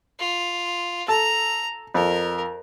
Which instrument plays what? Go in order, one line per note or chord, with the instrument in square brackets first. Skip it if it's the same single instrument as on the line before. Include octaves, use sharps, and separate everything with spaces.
[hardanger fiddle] F4
[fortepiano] A4 [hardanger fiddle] A#5
[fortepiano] F2 [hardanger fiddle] A#4